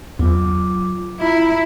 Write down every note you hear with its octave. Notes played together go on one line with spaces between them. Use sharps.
E2 F#3 F4 D6
E4 F4 A#5